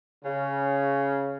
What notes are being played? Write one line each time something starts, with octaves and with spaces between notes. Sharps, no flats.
C#3